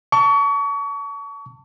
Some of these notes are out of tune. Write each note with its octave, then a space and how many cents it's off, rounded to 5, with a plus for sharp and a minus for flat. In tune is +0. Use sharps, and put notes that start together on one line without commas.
A5 +20 C#6 +35